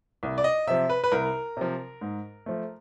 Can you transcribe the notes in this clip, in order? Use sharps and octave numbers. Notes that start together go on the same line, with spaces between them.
C2
D5
D#5
C3 F3 E5
B4
B4
C2 A#4
C3 F3
G#2
F3 A3